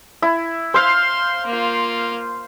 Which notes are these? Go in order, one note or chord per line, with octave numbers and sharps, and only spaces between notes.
E4
C5 F5 C6
A#3 F4